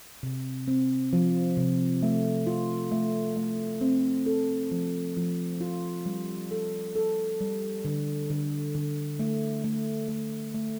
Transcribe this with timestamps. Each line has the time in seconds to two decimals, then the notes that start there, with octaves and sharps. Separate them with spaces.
0.23 C3
0.68 C4
1.13 F3
1.57 C3
2.03 A3
2.47 F4
2.92 A3
3.37 A3
3.81 C4
4.26 A4
4.71 F3
5.17 F3
5.61 F4
6.06 G3
6.51 A4
6.96 A4
7.40 G3
7.85 D3
8.30 D3
8.75 D3
9.19 A3
9.64 A3
10.09 A3
10.54 A3